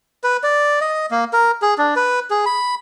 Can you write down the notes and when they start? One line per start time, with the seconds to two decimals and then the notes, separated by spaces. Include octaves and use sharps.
0.24 B4
0.43 D5
0.81 D#5
1.11 A#3
1.33 A#4
1.62 G#4
1.78 D4
1.96 B4
2.31 G#4
2.46 B5